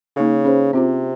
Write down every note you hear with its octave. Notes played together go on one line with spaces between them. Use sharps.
C#3 A#3 D#4 G#4 C#5
C#4 G#4 C5
C3 C4 F4 C5